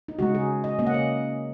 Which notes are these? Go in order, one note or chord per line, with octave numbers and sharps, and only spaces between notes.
D#4
C#3 G#3 D#4 F#4
G#4
D#5
C#3 A#3 C#4 D#5
F#5
D#5